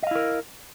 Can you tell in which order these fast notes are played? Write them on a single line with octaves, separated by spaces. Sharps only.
D#5 F5 E4 A#4